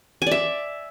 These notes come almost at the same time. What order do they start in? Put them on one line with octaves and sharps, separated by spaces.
G#5 D5 E5